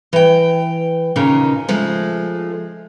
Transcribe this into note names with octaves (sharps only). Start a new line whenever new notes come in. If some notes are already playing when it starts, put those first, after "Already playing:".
E3 G5
D#2 A#2 C#3 D#4
F3 G#3 A3